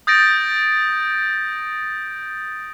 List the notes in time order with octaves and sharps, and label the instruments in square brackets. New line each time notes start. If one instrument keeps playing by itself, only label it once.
[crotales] D#6 G6 A6 A#6 D7